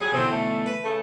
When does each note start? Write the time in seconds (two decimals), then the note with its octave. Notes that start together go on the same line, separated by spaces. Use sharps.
0.01 F#3 G3 G#4
0.12 B1 D3 E3 C4
0.30 A3
0.66 B4
0.83 C#3 A3